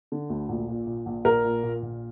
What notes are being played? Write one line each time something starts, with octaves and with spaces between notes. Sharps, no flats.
D3
D2
A#1
A#2
A#2
A#1
A#1 A#4
A#2
A#2
A#1